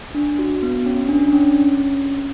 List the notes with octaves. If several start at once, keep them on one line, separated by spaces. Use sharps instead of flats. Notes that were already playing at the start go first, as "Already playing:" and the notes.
D4
F#4
B3
C#4
D4
D4
C#4